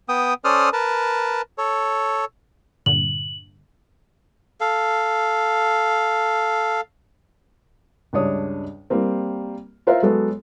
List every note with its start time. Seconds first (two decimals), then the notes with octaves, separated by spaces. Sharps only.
0.09 B3 G5 D#6
0.45 C#4 A4 C5 D5 D#6 F6
0.73 A#4 B4 A5
1.58 A4 C#5
2.86 G2 A#2 D3 F#7
4.61 A4 F5
8.13 C#2 G2 D4 C#5 D#6
8.90 G3 A#3 C4
9.87 F4 A#4 C5 E5 F5
10.03 F#3 G#3 B3 A4